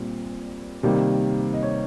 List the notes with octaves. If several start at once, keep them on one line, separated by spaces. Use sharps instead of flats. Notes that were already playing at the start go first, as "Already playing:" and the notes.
Already playing: A#2 G3 C4
C3 D#3 G3 A#3
D#5
C#5